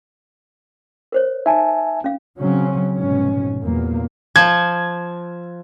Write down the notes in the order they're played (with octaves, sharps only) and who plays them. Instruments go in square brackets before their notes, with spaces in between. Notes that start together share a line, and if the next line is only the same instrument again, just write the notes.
[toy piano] A#4 C5 C#5
[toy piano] D#4 [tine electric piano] E5 G#5 A5
[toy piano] C#4 F5
[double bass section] C#3 F#3 C4 C#4
F1 G#2 B2 C#4
E2 A#2 F#3 A#3
[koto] F3 [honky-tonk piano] G#6